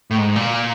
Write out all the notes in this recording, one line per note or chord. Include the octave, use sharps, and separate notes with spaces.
A2
G#2
A#2